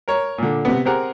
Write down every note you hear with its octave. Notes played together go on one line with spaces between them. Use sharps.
A#4 C#5
A#2 D3
C3 B3
C4 G4 G#4 A#4 F#5